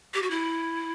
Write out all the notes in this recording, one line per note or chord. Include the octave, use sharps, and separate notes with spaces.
G4
F#4
E4